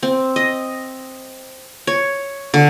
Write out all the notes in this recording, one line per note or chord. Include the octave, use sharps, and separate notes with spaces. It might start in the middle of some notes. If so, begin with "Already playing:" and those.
C4
D#5
C#5
D3